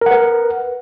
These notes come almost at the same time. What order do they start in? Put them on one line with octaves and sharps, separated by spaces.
A#4 F#5 B4